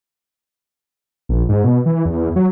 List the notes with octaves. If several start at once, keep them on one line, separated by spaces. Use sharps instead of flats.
A#1
G#2
B2
E3
E2
F#3